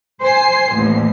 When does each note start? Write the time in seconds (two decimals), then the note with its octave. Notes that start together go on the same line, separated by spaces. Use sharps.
0.22 C5 G#5 C7
0.75 A1 D#2